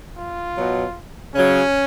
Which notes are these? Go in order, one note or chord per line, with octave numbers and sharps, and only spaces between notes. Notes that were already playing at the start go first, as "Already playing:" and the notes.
F4
B2 F#3
C#3 F#3 C#4